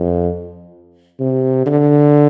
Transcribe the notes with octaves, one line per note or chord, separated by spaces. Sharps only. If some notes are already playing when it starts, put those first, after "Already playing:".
Already playing: F2
C3
D3